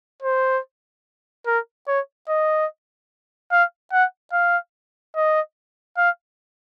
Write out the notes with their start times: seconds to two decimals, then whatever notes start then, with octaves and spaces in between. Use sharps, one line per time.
0.22 C5
1.46 A#4
1.87 C#5
2.28 D#5
3.51 F5
3.92 F#5
4.32 F5
5.16 D#5
5.97 F5